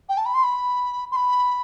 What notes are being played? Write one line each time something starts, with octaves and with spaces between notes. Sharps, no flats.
G5
A5
B5
C6
B5
C6
B5